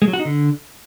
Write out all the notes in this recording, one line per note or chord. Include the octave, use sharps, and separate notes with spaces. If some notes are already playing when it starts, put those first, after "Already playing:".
G#3
F#3
F#4
D#4
D3